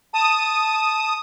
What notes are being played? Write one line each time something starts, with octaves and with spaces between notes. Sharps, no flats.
A5 D#6